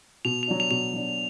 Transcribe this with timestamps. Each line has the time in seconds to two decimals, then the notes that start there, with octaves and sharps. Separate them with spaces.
0.25 B2 F7
0.43 F7
0.48 F#3 D4
0.60 F7
0.71 B2 F7
0.93 F#3 D4